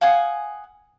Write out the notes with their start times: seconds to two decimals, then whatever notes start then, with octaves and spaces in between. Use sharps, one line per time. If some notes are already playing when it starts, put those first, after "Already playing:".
0.01 F5 F#5 G#5 D#6